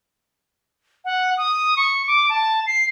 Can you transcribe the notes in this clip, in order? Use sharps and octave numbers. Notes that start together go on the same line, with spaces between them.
F#5
D#6
C#6
D6
A5
C7